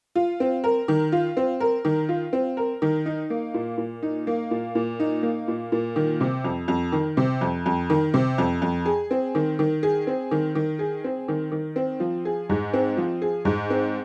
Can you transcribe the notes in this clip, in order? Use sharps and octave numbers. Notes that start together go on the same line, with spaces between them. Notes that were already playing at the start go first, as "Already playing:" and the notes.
F4
C4
A#4
D#3
F4
C4
A#4
D#3
F4
C4
A#4
D#3
D#4
A#3
A#2
A#2
D#4
A#3
A#2
A#2
D#4
A#3
A#2
A#2
D#3
C3
F2
F2
D#3
C3
F2
F2
D#3
C3
F2
F2
G#4
C4
D#3
D#3
G#4
C4
D#3
D#3
G#4
C4
D#3
D#3
C4
F3
G#4
G#2
C4
F3
G#4
G#2
C4